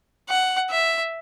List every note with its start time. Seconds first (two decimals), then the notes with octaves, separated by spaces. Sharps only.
0.29 F#5
0.71 E5